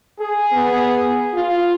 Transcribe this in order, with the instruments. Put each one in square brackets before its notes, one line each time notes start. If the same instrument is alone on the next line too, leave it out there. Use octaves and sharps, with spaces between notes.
[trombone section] G#4
[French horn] B3
F4